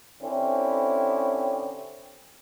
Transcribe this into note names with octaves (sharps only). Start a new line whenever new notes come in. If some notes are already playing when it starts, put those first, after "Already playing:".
D3 C4 C#4 E4 G4